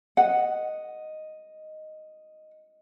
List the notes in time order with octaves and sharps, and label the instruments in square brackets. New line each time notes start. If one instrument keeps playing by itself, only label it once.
[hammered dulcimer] D#5 [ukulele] F#5